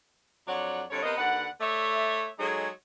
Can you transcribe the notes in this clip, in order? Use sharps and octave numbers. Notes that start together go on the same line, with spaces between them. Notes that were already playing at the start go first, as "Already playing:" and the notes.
F2 F#3 D4 C#5 D5 F#5
F2 D3 G3 C#5
C3 B3 A#4 C5 D#5
D#2 D3 B4 F#5
A3 C#5 D5 E5
F#3 G#3 D#4 G#4 A4 C#5